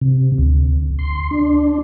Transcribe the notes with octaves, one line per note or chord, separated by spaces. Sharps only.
C3
D2
C6
D4